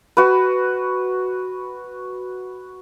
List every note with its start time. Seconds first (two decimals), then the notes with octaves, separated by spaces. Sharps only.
0.17 F#4 B4